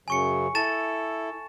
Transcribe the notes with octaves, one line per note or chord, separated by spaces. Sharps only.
F#2 C#3 F#3 G#5 C#6 C#7
E4 A4 A5 A6 E7